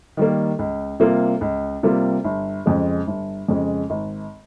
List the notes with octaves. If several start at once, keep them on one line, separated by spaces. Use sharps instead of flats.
D#3 G3 A#3
C#2
C3 G3 A#3 F4
C#2
C3 G3 A#3 F4
G1
F2 C#3 G#3
G1
F2 C#3 G#3
G#1